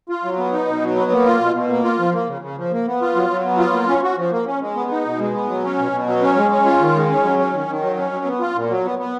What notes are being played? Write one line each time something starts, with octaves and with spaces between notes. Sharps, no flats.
F4
F#3
B3
D#4
B2
F#3
B3
A#3
F4
B2
B2
A#3
F4
F3
A#3
C#3
C#3
F3
A#3
B3
F4
F#3
F#3
B3
F4
A#3
C#4
F#4
F3
A#3
C#4
G#3
B3
D#4
B2
G#3
B3
F#3
C#4
B2
B2
F#3
C#4
G#3
C#4
F4
D#3
G#3
C#4
F#3
C#4
D#3
D#3
F#3
C#4
F#3
B3
F4
A#2
F#3
B3
B3